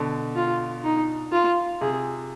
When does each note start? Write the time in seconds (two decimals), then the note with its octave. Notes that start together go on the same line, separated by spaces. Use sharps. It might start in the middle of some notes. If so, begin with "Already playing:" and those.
Already playing: B2 D3
0.35 F4
0.84 D#4
1.32 F4
1.81 C3 G#4